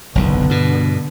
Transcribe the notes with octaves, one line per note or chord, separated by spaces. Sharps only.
F#1 B1 E2 D3 B3
G2 B2